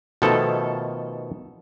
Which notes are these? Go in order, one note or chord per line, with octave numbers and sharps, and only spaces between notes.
B2 D#3 F3 A3 A4